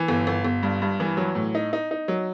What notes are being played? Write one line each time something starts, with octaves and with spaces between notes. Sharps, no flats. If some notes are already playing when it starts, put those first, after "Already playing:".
Already playing: E3
G1
G1
G1
G2
G2
E3
F#3
A2
D#4
D#4
D#4
F#3